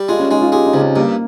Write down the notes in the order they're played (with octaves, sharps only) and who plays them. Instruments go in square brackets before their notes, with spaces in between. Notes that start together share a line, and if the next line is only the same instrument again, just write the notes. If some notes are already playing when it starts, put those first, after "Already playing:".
Already playing: [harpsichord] G3
[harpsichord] G#3 [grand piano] F4
[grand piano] C#4
[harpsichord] G#3 [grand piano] D#4
[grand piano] F4
[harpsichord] G#3 [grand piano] G4
[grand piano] D#4
[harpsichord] C#2 [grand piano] C4
[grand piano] C#4
[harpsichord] G2 [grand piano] A#3